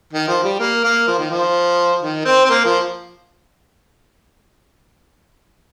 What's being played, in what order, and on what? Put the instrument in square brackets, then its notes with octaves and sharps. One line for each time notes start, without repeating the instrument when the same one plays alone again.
[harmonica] D#3
F3
G3
A#3
A#3
F3
D#3
F3
D#3
C4
C4
A#3
F3